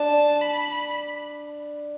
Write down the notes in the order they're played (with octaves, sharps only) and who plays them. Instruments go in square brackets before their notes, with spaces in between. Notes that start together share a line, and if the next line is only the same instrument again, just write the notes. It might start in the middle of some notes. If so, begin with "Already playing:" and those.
Already playing: [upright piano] D4 [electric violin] A5
[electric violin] B5